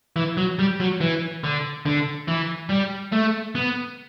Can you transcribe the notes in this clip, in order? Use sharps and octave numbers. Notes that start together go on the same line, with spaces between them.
E3
F#3
G3
F#3
E3
D3
D3
E3
G3
A3
B3